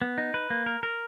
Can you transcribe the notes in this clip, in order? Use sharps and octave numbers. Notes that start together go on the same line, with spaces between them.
B3
D#4
B4
A#3
A#4
A#4